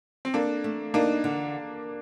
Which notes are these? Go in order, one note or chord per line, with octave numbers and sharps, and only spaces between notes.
C4
A#3 D4 A4
A3
A#3 D4 D#4
D3